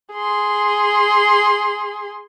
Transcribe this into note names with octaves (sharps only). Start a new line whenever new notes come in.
G#4 C6